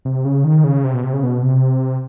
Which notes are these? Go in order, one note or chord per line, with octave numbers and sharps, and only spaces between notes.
C3
C#3
D#3
C#3
C3
B2
C3
C#3
B2
C3